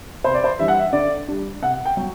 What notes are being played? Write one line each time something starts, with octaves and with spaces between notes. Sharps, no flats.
C3 C5
D5
C5
E3 G3 D4 E5
F#5
E5
D3 D5
G3 D4
C3 F#5
G5
F#3